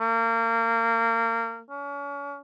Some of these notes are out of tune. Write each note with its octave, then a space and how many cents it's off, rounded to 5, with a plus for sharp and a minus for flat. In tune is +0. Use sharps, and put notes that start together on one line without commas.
A#3 -30
C#4 +35